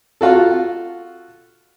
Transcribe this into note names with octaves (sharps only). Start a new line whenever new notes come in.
F4 F#4 A4